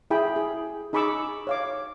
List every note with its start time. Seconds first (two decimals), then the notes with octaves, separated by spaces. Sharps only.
0.10 E4 G#4 G5 B5
0.36 G#4
0.93 D#4 G#4 B5 C#6 D6 E6
1.47 C#5 F5 D6